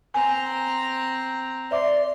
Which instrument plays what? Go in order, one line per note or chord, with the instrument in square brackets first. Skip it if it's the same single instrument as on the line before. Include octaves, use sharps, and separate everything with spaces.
[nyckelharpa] C4 A#5 [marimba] G#5
[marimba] C5 E5 D6 [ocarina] D5 [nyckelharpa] C6